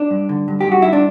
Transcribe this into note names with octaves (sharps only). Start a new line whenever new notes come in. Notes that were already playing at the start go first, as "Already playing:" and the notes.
Already playing: D4
G2
D3
G2
G4
G2 F#4
G2 E4
D4